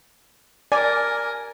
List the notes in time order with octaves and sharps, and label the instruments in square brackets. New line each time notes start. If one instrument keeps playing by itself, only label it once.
[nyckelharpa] A#4 [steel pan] D5 [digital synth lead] G#5